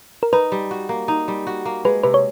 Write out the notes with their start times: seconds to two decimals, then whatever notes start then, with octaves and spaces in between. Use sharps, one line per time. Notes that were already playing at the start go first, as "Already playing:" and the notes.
0.23 A#4
0.33 D#4 B4
0.52 G3
0.71 F#4
0.89 A#3
1.08 D#4
1.28 G3
1.47 F#4
1.65 A#3
1.85 G#3 B4
2.03 C3 B4
2.14 C#5